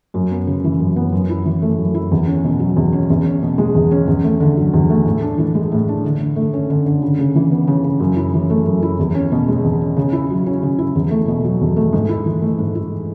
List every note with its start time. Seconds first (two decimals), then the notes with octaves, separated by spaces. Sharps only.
0.14 F#2
0.31 B3
0.47 C#3
0.64 E3
0.80 F#2
0.96 B3
1.12 F#2
1.30 E4
1.45 E3
1.62 A3
1.79 F#2
1.94 E4
2.11 E2
2.27 C#4
2.44 B2
2.60 F#3
2.76 E2
2.93 C#4
3.10 E2
3.26 C#4
3.43 B2
3.58 G#3
3.75 E2
3.91 C#4
4.07 E2
4.24 A3
4.40 D3
4.57 F#3
4.73 E2
4.90 A3
5.05 A2
5.22 D4
5.38 E3
5.55 G#3
5.72 A2
5.88 D4
6.04 D3
6.20 D3
6.36 A3
6.53 C#4
6.70 D3
6.86 D3
7.02 C#3
7.19 C#3
7.35 E3
7.51 B3
7.67 C#3
7.84 C#3
8.00 F#2
8.17 E4
8.34 E3
8.50 A3
8.66 F#2
8.82 E4
8.99 E2
9.15 C#4
9.32 B2
9.48 G#3
9.64 E2
9.81 C#4
9.97 C#3
10.13 E4
10.30 F#3
10.46 C#4
10.63 C#3
10.79 E4
10.95 E2
11.11 A3
11.28 B2
11.44 F#3
11.61 E2
11.76 A3
11.93 G#2
12.09 E4
12.26 E3
12.42 A3
12.58 G#2
12.75 E4